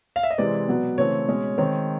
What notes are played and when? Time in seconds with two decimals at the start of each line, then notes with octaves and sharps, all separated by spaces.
0.16 F5
0.23 E5
0.30 D#5
0.38 C3 E3 G#3 C4 D5
0.68 B2 F#3 B3
0.98 C#3 E3 A3 C4 C#5
1.28 B2 G#3 C#4
1.58 D#3 G#3 C4 C#5